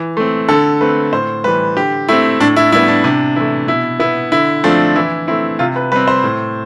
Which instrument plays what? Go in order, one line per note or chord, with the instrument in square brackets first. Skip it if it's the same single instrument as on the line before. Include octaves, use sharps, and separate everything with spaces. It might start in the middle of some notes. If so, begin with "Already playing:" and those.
Already playing: [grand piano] E3
A3 C4
D3 A4
A3 C4 B4
A2 C5
E3 G3 B4
D3 G4
A3 C4 E4
A2 D4
E4
G3 E4
B3
D4
C3 D4
E3 A3 E4
B2 E4
B3 E4
D3 E4
F3 A3 C4 D4
E3 E4
A3 C4 E4
C3 F4
B4
G3 C4 B4
C5
A2